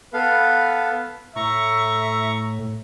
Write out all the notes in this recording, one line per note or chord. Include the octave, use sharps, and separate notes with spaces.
B3 A4 B4 F5
A2 E5 A#5 C#6